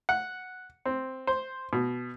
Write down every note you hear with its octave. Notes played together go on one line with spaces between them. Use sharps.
F#5
C4
C5
B2